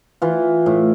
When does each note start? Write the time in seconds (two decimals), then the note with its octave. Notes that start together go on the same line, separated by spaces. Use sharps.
0.22 E3 F4
0.66 A2